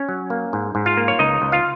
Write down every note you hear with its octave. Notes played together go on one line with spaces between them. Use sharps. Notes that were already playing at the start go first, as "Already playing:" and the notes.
Already playing: C#4 C#5
F#3
A#3
G#2
G#2
F4 F5
A#3
C#5
C#2 D#4 D#5
C#2
F4 F5